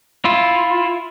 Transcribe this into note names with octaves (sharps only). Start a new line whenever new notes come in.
E4 F4